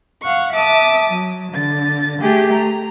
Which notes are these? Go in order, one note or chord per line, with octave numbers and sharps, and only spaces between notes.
F5 F#5 C#6
E5 A5 D6 D#6
F#3
D3 A6
A3 G4 G#4
A#5